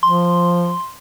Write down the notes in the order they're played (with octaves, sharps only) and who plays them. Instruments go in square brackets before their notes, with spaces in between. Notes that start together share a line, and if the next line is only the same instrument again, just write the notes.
[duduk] F3 [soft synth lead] C6